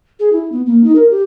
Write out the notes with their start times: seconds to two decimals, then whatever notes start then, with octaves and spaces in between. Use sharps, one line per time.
0.20 G#4
0.33 E4
0.52 B3
0.66 A#3
0.84 D#4
0.95 A#4
1.10 G4